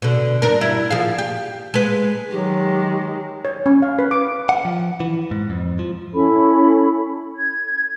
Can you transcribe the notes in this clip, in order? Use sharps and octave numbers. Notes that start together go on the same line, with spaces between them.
B2 D3
G2 D4 A#4
G3 E4
F3 G#4 F5
G4
G#3 B4
D#3 F#3 G#3 G4
C#5
C#4
F5
B4
D6
F#5
F3
E3
G#2
F2
F3
C#4 E4 A4 B5
G#6